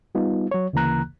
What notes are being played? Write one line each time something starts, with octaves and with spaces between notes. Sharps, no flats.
G3 B3 D#4 F4
F#3 C#5
D2 C#3 E3 A#3 A#5 F#6